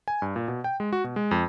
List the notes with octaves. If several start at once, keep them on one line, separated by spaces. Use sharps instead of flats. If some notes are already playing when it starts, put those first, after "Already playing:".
G#5
G2
A#2
B2
G5
G#3
F#4
B2
G#3
F2